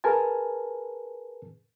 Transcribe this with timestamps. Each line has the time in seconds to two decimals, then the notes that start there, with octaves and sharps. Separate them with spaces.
0.04 G#4 A#4 B4 G#5 A5